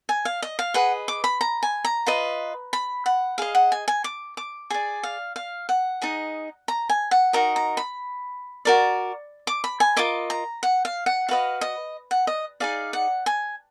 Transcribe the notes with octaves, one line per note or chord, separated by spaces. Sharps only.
G#5
F5
D#5
F5
G#4 B4 D#5 F#5
D6
B5
A#5
G#5
A#5
F4 B4 D#5
B5
F#5
G#4 D#5 F5
F#5
G#5
G#5
D6
D6
G#4 D5 G#5
F5
F5
F#5
D#4 G#4 D#5
A#5
G#5
F#5
D#4 F#4 A#4 D#5 A#5
A#5
B5
F#4 A#4 D5
D6
B5
G#5
F4 A#4 D#5 D6
A#5
F#5
F5
F#5
F#4 B4 D#5 F5
D#5
F#5
D#5
D#4 G#4 D5 F5
F#5
G#5